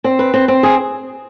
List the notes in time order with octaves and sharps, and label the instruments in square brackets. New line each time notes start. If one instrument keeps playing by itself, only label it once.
[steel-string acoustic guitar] C4
B4
C4
C4
G#4